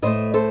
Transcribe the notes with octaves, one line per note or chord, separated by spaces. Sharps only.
A2 A3 C5 D#5
A4 C5